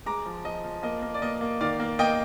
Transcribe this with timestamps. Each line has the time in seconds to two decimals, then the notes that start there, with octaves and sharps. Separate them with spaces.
0.06 G#3 A#5 D6
0.26 F3
0.45 F3 D#5
0.64 F3
0.83 A#3 D#5
1.02 A#3
1.14 D5
1.22 A#3 D#5
1.41 A#3
1.61 D#3 D5 F5
1.80 A#3
1.99 A#3 D#5 G5